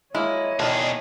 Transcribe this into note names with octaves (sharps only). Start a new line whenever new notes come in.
G#3 A#3 E4 C#5 D#5
B2 D#3 D4 G#4